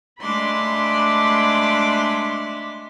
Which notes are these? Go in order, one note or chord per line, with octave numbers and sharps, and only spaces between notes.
G#3 A3 D4 B5 C6 D6